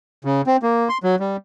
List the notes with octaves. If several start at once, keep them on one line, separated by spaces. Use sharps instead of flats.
C#3
C4
A#3
C6
F#3
G3